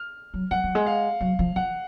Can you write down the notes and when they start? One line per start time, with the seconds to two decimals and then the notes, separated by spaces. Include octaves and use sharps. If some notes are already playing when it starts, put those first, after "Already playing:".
Already playing: F6
0.34 F#3
0.51 F#3 F#5
0.64 F#3
0.75 G#3
0.86 F5
1.21 F#3
1.39 F3
1.56 F3 F#5